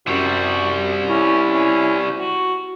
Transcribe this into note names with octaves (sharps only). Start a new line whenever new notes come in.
F#2 C3 G3 F#4
C#4 E4
C#4
F#4